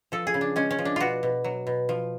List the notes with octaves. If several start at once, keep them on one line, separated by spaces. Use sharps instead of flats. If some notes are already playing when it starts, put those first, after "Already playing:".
F3 A4
G#4
C#3
D4
G#3 C#4
C#4
F3
D4
B2 F4 F#4
B2
F#3
B2
F3